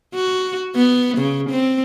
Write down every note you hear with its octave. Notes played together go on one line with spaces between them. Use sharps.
F#4
B3
C#3
C4